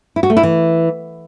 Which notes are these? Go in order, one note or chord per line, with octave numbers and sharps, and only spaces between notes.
E4
F#4
A3
E4
E3